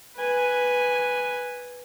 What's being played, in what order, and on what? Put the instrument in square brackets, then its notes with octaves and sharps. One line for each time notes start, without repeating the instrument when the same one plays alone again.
[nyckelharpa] B4 G#5